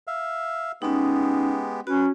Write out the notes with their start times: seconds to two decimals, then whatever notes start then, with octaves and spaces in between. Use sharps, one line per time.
0.07 E5 F5
0.82 G#3 B3 C#4 D#4 G4
1.87 C#4 F#4 B4